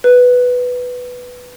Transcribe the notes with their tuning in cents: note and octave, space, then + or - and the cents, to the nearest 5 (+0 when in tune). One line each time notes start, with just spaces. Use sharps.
B4 +5